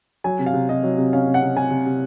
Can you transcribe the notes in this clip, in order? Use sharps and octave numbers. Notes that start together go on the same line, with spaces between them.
F#3 G#5
C3
F5
C3
C3 D#5
F#3
C3
C#4 F5
C3
F#5
C3
C3 G#5
C3
C3